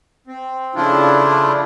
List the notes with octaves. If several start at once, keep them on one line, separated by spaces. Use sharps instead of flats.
C4
C#3 F3 A3 D4 E4 F4